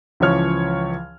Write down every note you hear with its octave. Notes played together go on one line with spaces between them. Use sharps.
C#2 E3 F3 C#5 F6